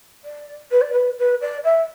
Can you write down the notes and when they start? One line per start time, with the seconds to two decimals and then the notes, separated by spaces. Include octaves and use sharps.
0.24 D5
0.71 B4
0.81 D5
0.93 B4
1.18 B4
1.41 D5
1.64 E5